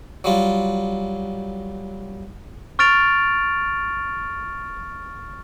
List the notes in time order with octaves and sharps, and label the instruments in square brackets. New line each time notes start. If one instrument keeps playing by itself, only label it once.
[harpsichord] F#3 G3 F4
[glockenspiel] C#6 F6 A6 D7 F7